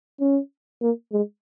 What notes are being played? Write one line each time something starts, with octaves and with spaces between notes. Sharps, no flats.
C#4
A#3
G#3